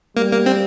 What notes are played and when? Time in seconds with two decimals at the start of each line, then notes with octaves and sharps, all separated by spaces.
0.17 G3 A#3
0.32 A#3
0.46 C4